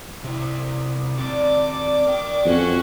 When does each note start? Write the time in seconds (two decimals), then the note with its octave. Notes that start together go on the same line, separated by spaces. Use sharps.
0.24 C3 E4
1.18 C4 F#4 D5 D6
2.07 A#4 G5
2.45 F2 C#4 F#4